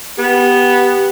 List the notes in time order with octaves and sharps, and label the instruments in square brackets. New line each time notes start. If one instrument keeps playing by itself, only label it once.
[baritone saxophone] B3 [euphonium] G4